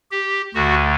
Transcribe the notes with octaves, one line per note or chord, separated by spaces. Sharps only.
G4
D2 D3 F#4